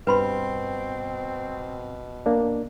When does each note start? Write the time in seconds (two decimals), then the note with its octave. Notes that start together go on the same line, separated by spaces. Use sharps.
0.07 G2 B2 C4 B4 B5 C6
2.26 A#3 D4